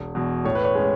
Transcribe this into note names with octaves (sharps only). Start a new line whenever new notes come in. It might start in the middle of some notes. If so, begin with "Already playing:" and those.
Already playing: E1
E2 B2
A2 C#5
B4
C#5
G#3 C#4